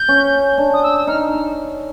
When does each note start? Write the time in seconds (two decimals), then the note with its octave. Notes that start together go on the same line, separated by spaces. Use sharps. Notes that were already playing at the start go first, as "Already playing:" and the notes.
Already playing: G6
0.09 C#4
0.58 D4
0.73 D#6
0.83 E6
1.07 D#4 F6